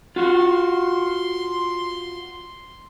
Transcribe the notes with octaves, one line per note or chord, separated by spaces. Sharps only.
F4 F#4 C6